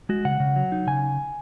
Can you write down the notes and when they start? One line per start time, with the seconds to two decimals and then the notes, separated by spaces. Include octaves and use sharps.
0.09 G#3 F#4
0.25 C#3 F#5
0.40 C#3
0.56 F#3
0.72 D#4
0.87 C#3 G#5